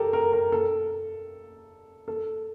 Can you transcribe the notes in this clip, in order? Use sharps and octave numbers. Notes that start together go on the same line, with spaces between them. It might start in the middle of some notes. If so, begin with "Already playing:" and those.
Already playing: G4 A4 A#4
A#4
A#4
A4
A4